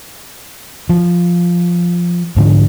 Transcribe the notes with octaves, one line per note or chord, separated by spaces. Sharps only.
F3
G#2 D3 F3